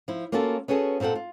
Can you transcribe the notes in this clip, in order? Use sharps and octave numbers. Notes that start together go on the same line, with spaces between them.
F3 E4
A#3 C#4 F4 F#4 A4
B3 C#4 F#4 G#4 A4
A#2 C4 F4 A4 F#5
F4